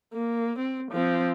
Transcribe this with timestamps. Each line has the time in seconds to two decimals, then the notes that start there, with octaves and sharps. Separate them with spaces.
0.14 A#3
0.59 C4
0.91 F3 C4